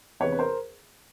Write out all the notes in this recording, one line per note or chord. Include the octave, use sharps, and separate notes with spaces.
E2 C3 E3 B4 C#5
B4
A#4 C5